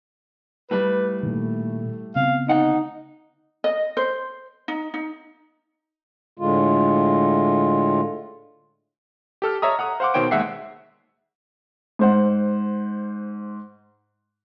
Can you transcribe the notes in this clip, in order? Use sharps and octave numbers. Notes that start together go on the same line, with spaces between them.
A2 G3 B4
A#2 D#3 A3
C#3 B3 C4 F5
D2 D#4 F#5
D#5
C5
D#4
D#4
A2 D3 G#3 F4
G4 A4 F6
A4 C#5 D#5 E5 A#5 D#6
F#5 A#5 D#6
C5 F5 F#5 C6 D6
B2 D#3 C5 C#5 G5 D7
D#2 G#3 E5 F#5 C7
G#2 C5 F#5